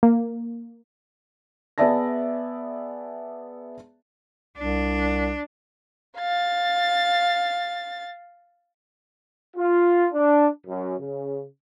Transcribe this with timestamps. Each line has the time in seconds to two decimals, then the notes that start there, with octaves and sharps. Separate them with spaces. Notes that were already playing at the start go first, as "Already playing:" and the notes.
0.03 A#3
1.78 B3 G#4 D5 E5 A5 A#6
4.58 C2 D4
6.18 F5 A6
9.57 F4
10.13 D4
10.67 F#2
10.99 C#3